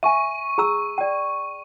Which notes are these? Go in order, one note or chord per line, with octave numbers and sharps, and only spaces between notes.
E5 G#5 C#6 D#7
G#4 A#5 E6
D5 G5